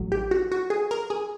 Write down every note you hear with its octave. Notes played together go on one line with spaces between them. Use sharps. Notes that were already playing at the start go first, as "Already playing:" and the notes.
Already playing: A1 A2 F#3
G4
F#4
F#4
G#4
A#4
G#4